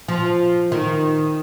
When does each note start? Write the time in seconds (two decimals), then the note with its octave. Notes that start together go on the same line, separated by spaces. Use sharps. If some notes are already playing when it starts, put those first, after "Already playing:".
0.08 F3
0.72 D#3